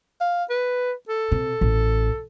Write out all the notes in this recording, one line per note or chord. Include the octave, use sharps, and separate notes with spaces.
F5
B4
A4
C3
A1